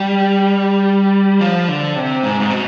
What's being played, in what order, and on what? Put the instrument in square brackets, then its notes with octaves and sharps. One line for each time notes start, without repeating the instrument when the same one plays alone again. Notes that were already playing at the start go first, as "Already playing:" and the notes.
Already playing: [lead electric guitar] G3
F3
D3
C3
G#2
G#2
B2